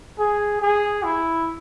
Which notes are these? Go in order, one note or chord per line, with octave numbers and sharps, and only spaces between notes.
G#4
G#4
E4